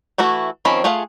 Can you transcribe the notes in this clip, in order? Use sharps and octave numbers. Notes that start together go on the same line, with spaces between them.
E3 A3 E4 F#4
D#3 F3 C4 C#4 B5
A3 F4 G#4 F5 F#5